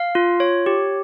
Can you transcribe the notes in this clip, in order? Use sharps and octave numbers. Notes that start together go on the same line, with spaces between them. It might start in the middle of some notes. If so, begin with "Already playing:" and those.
Already playing: F5
F4
C#5
G4